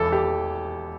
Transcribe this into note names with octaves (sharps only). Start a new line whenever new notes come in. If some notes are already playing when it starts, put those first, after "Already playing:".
Already playing: E1 E2 E3 A4
G4